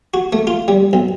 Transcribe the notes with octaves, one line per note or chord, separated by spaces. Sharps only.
F#4
A3
F4
G3
B1